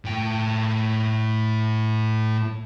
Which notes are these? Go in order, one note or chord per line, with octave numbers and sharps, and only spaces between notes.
A2 G5